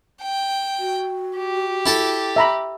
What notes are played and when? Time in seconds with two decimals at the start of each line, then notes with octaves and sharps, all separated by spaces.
0.22 G5
0.79 F#4
1.37 G4
1.86 E4 A4 A5
2.36 E5 A#5 B5